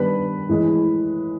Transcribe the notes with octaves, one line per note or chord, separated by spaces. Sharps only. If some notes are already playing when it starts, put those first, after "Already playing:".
Already playing: D#3 G3 B3 D4 B4 B5
A2 E3 G#3